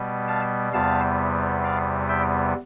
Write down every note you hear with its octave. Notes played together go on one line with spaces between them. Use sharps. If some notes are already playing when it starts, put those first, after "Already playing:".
Already playing: B2 G3 B3
F5 A5
E2 C3 G3 B3 F5 A5
D5 F5
E5 G5